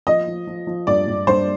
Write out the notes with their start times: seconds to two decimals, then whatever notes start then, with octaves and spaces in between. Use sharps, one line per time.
0.07 F3 D#5
0.27 F3
0.47 F3
0.67 F3
0.87 G2 D5
1.08 G2
1.27 G2 C5